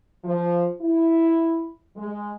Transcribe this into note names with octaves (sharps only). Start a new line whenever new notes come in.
F3
E4
G#3